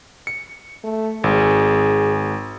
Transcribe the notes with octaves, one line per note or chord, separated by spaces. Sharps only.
C#7
A3
G#1 G#4